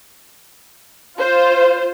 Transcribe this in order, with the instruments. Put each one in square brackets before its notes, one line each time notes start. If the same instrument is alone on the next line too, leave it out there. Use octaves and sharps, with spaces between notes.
[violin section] F4 C5